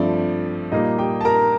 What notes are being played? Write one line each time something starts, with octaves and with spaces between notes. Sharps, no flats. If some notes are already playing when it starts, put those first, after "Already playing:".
Already playing: G2 F3 A3 C4 D5
A#2 G3 A#3 D#4 D#5
G4 G5
A5
A#4 A#5